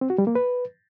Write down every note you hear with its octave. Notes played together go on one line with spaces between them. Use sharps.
C4
F#4
G3
A#3
B4